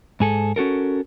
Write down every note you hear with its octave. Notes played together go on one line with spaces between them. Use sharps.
G#2 G#4 A4
C#4 F#4 A4 A#4